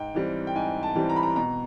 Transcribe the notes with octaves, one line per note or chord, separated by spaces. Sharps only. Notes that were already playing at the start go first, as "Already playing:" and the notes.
Already playing: G#2 G5
E3 G3 C4
G5
G#2 G#5
A5
E3 G3 C4
A#5
B5
A#5
B2 A#5